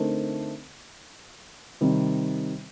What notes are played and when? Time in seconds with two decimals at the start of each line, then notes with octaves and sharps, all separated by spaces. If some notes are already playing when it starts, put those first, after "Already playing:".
Already playing: D3 A3 C4 D#4 A#4
1.81 C3 D#3 G3